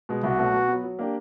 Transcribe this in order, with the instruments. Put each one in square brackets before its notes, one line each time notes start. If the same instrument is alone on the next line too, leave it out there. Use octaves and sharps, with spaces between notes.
[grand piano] B2 G#3
[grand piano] C2 [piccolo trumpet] F#4
[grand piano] B2 F#3 A3
B2
F#3 B3
F#3
A#3 D4 G4